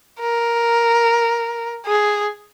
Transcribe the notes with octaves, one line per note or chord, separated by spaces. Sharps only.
A#4
G#4